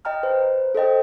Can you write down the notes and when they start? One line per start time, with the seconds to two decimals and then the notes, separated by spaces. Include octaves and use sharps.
0.05 D#5 G5 A#5 F6
0.23 B4 C5
0.75 A4 C5 D#5 G5